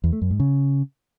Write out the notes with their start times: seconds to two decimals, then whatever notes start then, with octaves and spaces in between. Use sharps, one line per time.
0.04 E2
0.13 A3
0.22 F#2
0.31 G#2
0.40 C#3